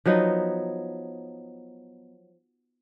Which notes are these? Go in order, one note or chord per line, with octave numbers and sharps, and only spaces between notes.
F3 F#3 B3 D#4